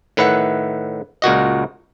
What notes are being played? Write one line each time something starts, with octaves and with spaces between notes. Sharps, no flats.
A2 D#3 B4 E5 F#5
C#2 A#2 F#4 D#5